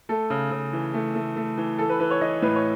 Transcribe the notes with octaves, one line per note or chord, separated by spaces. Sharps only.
A3 A4
C#3
C#3
E3
A3
A3
A3
E3
E3 A4
B4
E3 B4
C#5
E3 D#5
A2 B4
C#5